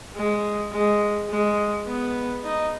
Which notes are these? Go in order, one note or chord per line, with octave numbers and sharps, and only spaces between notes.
G#3
G#3
G#3
B3
D#4